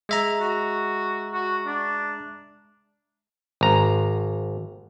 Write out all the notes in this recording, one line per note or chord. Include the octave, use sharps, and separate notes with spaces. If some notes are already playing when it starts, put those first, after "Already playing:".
G#3 E5 A#5
F#4
F#4
D4
G#1 A#5